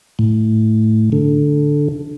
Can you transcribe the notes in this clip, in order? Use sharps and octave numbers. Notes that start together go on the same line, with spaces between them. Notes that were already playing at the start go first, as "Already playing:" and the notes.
A2
D3